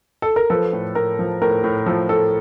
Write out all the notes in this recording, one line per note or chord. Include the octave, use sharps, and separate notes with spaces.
A4
A#4
F3 A4 B4
A2
A2 A#4
F3
A2 A#4
A2
F3 A4
A2 A4